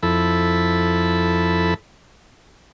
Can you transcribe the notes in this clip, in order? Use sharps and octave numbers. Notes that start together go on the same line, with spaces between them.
F2 E4 A4 B5